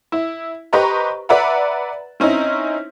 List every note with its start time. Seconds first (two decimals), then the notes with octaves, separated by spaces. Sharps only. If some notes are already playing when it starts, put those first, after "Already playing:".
0.12 E4
0.73 G4 B4 C5 D#5 A#5 C#6
1.29 B4 D5 E5 F#5 A#5 B5
2.20 C4 C#4 D#4 E4